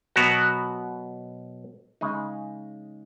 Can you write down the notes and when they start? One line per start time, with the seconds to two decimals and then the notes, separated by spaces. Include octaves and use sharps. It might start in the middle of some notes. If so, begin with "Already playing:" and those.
0.16 B2 F#3 B3 F#4 A#4
2.01 C#3 G#3 D#4 G#4